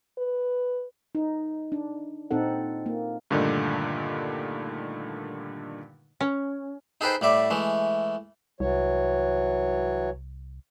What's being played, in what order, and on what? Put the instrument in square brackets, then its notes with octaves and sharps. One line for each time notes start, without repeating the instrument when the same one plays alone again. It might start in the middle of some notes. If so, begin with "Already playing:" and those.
[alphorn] B4
[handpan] D#4
D4
A#2 C4 D#4 A4 F#5
A#3
[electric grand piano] G2 A#2 D3 D#3 A3 D#4
[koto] C#4
[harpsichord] D#4 G#4 A4 B4 C5 G5
A2 G3 D5 E5
E3 G#3 A3
[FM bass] C2 [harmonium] E3 F#3 C#5